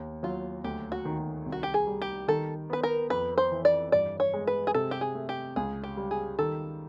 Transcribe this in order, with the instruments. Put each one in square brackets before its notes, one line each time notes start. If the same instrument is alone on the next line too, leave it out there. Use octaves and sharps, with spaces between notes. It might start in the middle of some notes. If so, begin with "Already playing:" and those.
Already playing: [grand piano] D#2
[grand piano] F#3 [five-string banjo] F4
[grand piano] D2 [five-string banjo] G4
[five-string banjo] F#4
[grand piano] D#3
C2
[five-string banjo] F#4
G4
G#4
[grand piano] G3
[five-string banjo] G4
[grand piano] D#3 [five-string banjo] A4
[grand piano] B3 [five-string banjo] B4
[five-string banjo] A#4
[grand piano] F2 [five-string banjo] B4
[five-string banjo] C5
[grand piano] E3
[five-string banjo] D5
[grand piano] G2 [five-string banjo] D5
[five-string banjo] C#5
[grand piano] G#3
[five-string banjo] B4
G#4
[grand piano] C3 [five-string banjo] A4
[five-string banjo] G4
G#4
[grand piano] A3
[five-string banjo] G4
[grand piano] C#2 [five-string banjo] G#4
[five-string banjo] G4
[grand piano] G3
[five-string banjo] G#4
[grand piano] D#3 [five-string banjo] A4